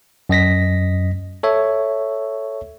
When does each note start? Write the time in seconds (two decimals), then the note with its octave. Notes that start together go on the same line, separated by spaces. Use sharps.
0.29 F#2 D#5 A#6 B6
1.43 A4 C#5 E5